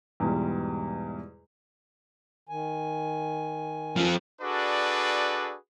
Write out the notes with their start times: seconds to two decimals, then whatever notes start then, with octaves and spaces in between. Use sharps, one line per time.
0.20 E2 G#2 B2 G3
2.49 D#3 G#5
3.96 F3 C4
4.41 D4 F#4 G#4 A4 B4 D5